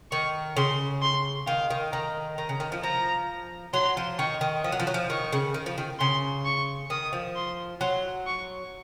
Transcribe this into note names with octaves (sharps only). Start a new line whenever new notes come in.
D#3 C#6
C#3 C6
C6
D#3 F5
D#3
D#3 A#5
D#3 A#5
C#3
D#3
F3
F3 A#5
F#3 C6
F3
D#3 C#6
D#3
F3 D#6
F#3
F3
F#3
F3
D#3 C#6
C#3
D#3
F3
D#3
C#3 C6
C#6
D#3 D#6
F3
C6
F#3 C6
C#6